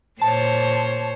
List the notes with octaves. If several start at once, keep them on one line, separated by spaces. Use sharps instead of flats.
A#2 C5 C#5 A5